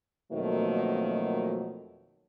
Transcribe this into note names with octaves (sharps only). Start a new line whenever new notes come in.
F2 B2 D#3 F#3 A3 A#3